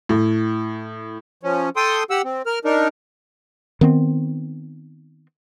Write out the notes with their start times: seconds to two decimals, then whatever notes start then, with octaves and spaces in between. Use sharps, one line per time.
0.09 A2
1.43 F3 C#4
1.76 A4 G5 C6 D#6
2.10 G4 F#5 E6
2.24 C4
2.46 A#4 F6
2.65 D4 D#4 A#4
3.81 D#3 B3 C4